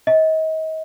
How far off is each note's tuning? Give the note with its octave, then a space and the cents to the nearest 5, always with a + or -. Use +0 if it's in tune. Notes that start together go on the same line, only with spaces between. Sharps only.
D#5 +35